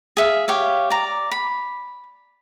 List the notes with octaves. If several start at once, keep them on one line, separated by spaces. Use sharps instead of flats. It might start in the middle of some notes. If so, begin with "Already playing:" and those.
G#4 E5 F5
G4 C#5 F5
D5 A#5
B5